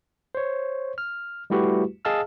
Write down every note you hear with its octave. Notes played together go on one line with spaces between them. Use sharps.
C5 C#5
F6
G3 A3 E4 F#4 G4 B4
G#4 D#5 F5 A5 E6 F6